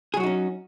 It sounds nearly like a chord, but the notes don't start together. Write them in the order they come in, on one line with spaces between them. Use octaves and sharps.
G#4 F#3 F#4 D#4 C#4